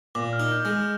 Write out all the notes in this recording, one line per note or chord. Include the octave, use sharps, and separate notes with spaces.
A#2 D6
F6
D#4
G6
G#3
F6